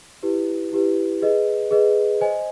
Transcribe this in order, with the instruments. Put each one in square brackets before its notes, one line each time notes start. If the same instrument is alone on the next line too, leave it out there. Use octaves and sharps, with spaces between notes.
[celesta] E4 G4 B4
E4 G4 B4
G#4 B4 D#5
G#4 B4 D#5
C5 D#5 G#5